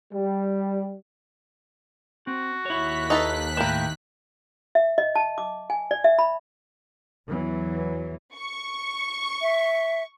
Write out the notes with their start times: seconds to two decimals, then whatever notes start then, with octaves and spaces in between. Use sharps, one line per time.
0.14 G3
2.27 C4 F#4
2.66 D#2 E4 C#5 F#6 B6
3.10 D#4 A4 B4
3.57 A2 A#3 E4 A#4 G5 A5
4.75 E5
4.98 D#5
5.15 A5
5.38 D6
5.70 G#5
5.91 D5
6.04 E5
6.19 B5
7.26 E2 E3 F#3
8.36 C#6
9.42 E5